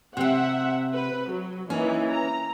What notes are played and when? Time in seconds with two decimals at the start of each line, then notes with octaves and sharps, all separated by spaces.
0.17 C3 C4 E5 F#5
0.95 B4
1.32 F#3
1.70 E3 A#3 C#4 D#4
2.10 A#5